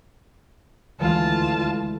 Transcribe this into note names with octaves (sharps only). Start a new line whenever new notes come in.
D2 E3 G#3 F4 A5